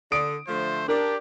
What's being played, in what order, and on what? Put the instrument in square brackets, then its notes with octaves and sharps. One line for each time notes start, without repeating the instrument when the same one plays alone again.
[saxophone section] D3 [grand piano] D#6 D7
[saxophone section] D3 F3 A3 [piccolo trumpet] C5
[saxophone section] D4 [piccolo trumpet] G4 [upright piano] A#4